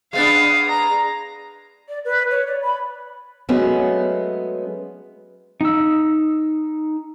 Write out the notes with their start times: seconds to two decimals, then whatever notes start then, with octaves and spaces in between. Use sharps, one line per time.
0.13 G#3 B3 D4 F5
0.69 A#5
1.89 D5
2.05 B4
2.31 C#5
2.47 D5
2.62 B5
3.49 F#3 G#3 A3 B3 C#4
5.61 D#4 E6